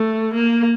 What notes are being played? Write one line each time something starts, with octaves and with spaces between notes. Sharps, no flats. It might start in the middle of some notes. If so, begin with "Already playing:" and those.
Already playing: A3
A#3